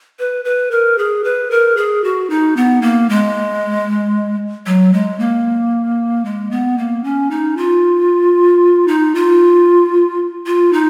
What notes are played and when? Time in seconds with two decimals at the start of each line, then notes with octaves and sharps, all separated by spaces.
0.19 B4
0.45 B4
0.71 A#4
0.98 G#4
1.24 B4
1.51 A#4
1.77 G#4
2.04 F#4
2.30 D#4
2.57 B3
2.82 A#3
3.09 G#3
4.66 F#3
4.93 G#3
5.19 A#3
6.25 G#3
6.51 B3
6.78 A#3
7.04 C#4
7.31 D#4
7.57 F4
8.88 D#4
9.15 F4
10.46 F4
10.73 D#4